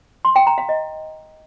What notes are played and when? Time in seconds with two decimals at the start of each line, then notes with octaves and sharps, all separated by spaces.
0.25 C6
0.36 G5
0.47 A#5
0.58 F5
0.69 D#5